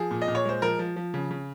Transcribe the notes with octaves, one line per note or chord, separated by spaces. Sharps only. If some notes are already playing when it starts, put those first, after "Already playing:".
Already playing: F3 G#4
A#2
D#5
A#2
C#5
G#3 C5
F3 A#4
F3
F3
C#3
C#3